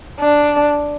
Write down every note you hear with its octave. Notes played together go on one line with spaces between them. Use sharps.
D4